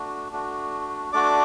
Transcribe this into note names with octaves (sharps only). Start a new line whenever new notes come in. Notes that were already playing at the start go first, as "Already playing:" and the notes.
Already playing: A3 D4 F#4
A3 D4 F#4
A3 D4 F#4 D5 D6